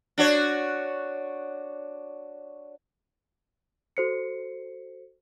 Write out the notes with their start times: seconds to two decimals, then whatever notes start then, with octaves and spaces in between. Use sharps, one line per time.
0.18 D4 F#4 C#5
3.97 F#4 A4 C5 C7 C#7